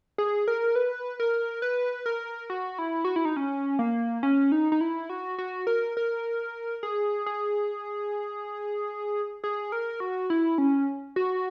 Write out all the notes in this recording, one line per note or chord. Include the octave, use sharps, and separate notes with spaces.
G#4
A#4
B4
A#4
B4
A#4
F#4
E4
F#4
E4
D#4
C#4
A#3
C#4
D#4
D#4
E4
F#4
F#4
A#4
A#4
G#4
G#4
G#4
A#4
F#4
E4
C#4
F#4